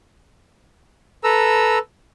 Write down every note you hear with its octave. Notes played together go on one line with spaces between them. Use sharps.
A4 B4 A#5 E6